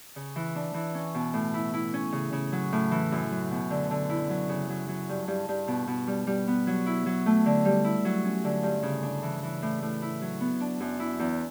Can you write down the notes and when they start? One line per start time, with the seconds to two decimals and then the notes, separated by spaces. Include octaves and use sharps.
0.16 C#3
0.36 E3
0.55 D4
0.74 E3
0.95 C#4
1.15 B2
1.33 A2
1.54 E4
1.73 E4
1.94 C#4
2.12 C#3
2.32 C#3
2.52 F#3
2.72 A2
2.91 E3
3.12 F#2
3.31 F#3
3.51 B2
3.70 D3
3.91 D3
4.10 E4
4.30 F#3
4.49 C#3
4.69 F#3
4.88 F#3
5.09 G2
5.28 G2
5.48 G2
5.68 B2
5.87 B2
6.07 G3
6.27 G3
6.47 B3
6.67 F#3
6.86 E4
7.06 F#3
7.26 A3
7.46 D3
7.65 G3
7.84 E4
8.05 F#3
8.25 C#4
8.44 D3
8.63 G2
8.83 C#3
9.03 D4
9.22 E3
9.43 E3
9.62 A2
9.82 A2
10.02 E4
10.22 F#3
10.40 B3
10.60 D4
10.80 F#2
11.00 E4
11.19 E2